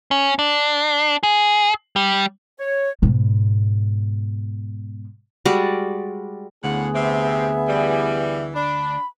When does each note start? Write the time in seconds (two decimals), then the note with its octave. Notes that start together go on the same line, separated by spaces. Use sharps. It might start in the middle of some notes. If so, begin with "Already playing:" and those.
0.11 C#4
0.39 D4
1.23 G#4
1.96 G3
2.59 C#5
3.02 G#2 B2
5.45 G3 G#3 F#4 D5
6.64 D2 A2 C#3 B3 G#4 F#5
6.94 C3 C4 E5
7.68 E3 G3
8.55 D4 B5